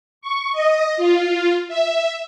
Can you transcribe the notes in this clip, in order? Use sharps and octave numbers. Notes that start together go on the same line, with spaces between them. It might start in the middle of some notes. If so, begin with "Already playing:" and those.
C#6
D#5
F4
E5